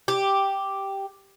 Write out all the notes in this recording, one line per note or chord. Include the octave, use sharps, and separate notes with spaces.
G4